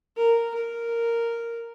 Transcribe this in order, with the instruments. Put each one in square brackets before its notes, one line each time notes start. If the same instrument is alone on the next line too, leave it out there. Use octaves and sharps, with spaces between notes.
[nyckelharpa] A#4
A#4